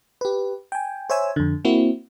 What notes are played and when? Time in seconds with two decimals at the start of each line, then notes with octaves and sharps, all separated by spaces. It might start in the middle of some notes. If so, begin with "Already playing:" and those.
0.21 G4 B4
0.72 G5 G#5
1.10 C5 C#5 E5 G#5 E6
1.36 F2 D3
1.65 A#3 C4 E4 F#4